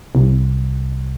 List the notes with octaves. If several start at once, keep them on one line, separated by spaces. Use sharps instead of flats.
C2